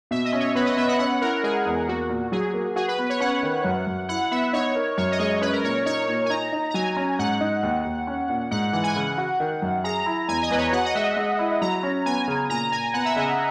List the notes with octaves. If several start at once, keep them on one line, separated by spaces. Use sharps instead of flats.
B2 E5
D#5
C#4
C#5
B3 B4
D#5
B3 E5
F#5
C#4 F#5
E4 A#4
G#3 G#4
E2
A#3 F#4
A#2
F#3 G#4
A#3
F#4 G#4
B4
B3
C#5
C#4 F#5
D#3
F#2
F#2
E4 F#5
B3 E5
D#4 C#5
A#4
F#2 C#5
D#5
G#3 C#5
C#4 B4
A#4
A#2 C#5
D#4 C#5
A#2
G#5
D#4 A#5
D#4
A#5
F#3 G#5
C#4
G#2 F#5
D#4
D#2
D#2
C#4
A#2
G#2 F#5
E3 F#5
G#5
C#3 F#5
F#4
D#3
F#2
G#4 A#5
E4
E2 G#5
D#5
E2 B4
C#5
F#4 F#5
D#5
G#3 E5
G#3
E4
F#3 A#5
C#4
B3 G#5
C#3
A#2 A#5
A#2 G#5
B3 F#5
E5
C#3 D#5